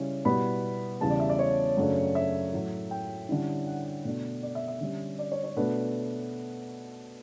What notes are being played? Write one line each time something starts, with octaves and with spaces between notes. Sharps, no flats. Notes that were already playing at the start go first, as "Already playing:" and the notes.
Already playing: C#3 G3 C#4 E4
B2 G3 B3 E4 B5
E2 C#3 G3 A5
D5
E5
D5
C#5
F#2 C#3 F#3 A3 D4
E5
A2 F#3 A3
G5
D3 G3 C#4 E4
F#5
B2 A3 D4
D5
E5
E5
D3 G3 C#4
D5
C#5
C#5
B2 A3 D4 B4